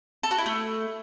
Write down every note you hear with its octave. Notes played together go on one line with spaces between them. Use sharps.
A4
F#4
E4
A3